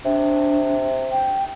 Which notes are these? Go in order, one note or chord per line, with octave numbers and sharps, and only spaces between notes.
C3 D4
G5